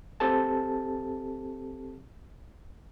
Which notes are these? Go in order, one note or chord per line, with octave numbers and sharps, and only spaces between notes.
C4 G4 A4 A5